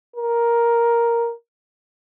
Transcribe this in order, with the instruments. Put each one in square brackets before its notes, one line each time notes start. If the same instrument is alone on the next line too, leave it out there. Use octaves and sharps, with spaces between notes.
[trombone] A#4